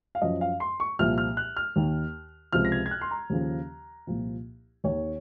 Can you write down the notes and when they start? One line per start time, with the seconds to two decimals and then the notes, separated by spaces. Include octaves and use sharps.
0.15 F5
0.22 F#2 F3 D#5
0.41 F5
0.60 C6
0.80 C#6
0.99 C2 A#2 F3 F6
1.18 F6
1.37 F#6
1.57 F6
1.76 D#2 D#3
2.53 C#2 C3 F3 F6
2.65 A#6
2.72 G#6
2.86 G#6
2.91 F#6
3.01 C6
3.11 A#5
3.30 D#2 C#3 F3
4.07 C2 A#2 F3
4.84 D#2 D#3 C#5